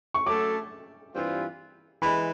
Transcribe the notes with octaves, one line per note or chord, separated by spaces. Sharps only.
C#6
F#3 A3 C#4 F#4 A4 D6
G2 E3 G3 C4 F4
E3 G#3 B5